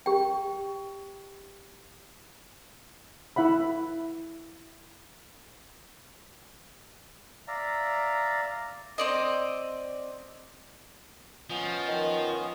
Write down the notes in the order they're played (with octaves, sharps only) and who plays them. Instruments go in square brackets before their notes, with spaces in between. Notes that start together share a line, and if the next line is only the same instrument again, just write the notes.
[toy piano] G4 G5
[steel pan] E4 E5 F#5 B5
[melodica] D5 E5 F5 A#5
[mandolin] C4 D5 D#5
[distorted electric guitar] F3 [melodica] B3 C#4 D#5
[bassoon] D#3